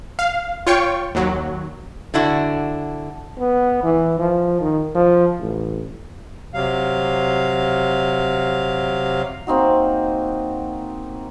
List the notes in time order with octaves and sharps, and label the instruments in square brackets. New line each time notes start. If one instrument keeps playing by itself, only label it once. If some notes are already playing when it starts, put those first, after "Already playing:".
[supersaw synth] F5
F4 C#5 G5 C#6
D#2 F#3
[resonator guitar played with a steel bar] D3 D4 E4 F#4
[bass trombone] B3
E3
F3
D#3
F3
A1
[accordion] C3 F#3 F5
[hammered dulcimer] A#3 C4 D#4 F#4